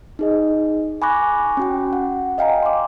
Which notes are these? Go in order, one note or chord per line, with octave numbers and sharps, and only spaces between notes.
D#4 G#4 D#5
G#5 B5 C#6 D6 F#6 A#6
C#4 F#4 G5
F#5
D#5 F5 G5 G#5 A#5
C6 D6